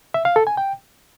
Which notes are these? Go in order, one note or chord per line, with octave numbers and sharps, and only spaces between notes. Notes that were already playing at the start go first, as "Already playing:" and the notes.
E5
F5
A4
G#5
G5